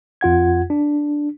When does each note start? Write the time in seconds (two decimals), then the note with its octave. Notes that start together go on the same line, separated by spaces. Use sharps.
0.21 F2 F4 F#5 G#6
0.70 D4